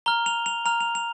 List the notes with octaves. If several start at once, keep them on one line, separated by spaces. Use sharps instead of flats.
A#5 F6 G7
F7
F7
A#5 F6 F7
F7
F7